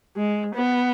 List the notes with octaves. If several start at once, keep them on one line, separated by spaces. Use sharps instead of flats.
G#3
B3